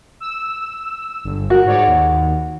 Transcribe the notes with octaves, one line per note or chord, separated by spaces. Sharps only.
E6
G1
F#4 A#4
G#2 C#5 D5
D#2